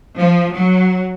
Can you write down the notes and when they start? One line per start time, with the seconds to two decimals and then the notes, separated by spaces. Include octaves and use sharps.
0.18 F3
0.55 F#3